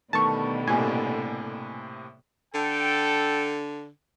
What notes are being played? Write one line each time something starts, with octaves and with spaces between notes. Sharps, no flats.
B2 D3 D#3 G3 A3 B3 A5 C#6
A2 C3 A#3 G#5
D3 A4 G5